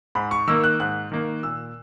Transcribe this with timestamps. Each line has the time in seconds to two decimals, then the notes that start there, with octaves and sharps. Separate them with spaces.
0.15 G#2 B5
0.31 C#6
0.47 D#3 A#3 E6
0.64 F#6
0.80 G#2 F#6
1.12 D#3 A#3
1.43 A#2 E6